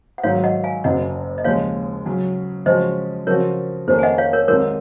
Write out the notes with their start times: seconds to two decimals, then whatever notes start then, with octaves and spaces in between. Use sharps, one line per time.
0.18 F#5
0.23 G#2 D#3 F#3 C#5 F5
0.44 D#5 F#5
0.64 F5 G#5
0.84 F#1 F#2 C#3 D#5 F#5
1.38 D#5
1.44 D#2 C#3 F3 G#3 C#5 F5
2.06 C#3 F#3 C#4
2.66 C#3 F3 G#3 C#4 F#4 C5 D#5
3.27 C#3 F3 C4 F#4 A#4 C#5
3.88 F2 D#3 A#3 C#4 G#4 C5
3.99 G#5
4.03 D#5 F#5
4.18 C#5 F5
4.33 A#4 C#5
4.48 C2 C3 D#3 G#3 A#4 C#5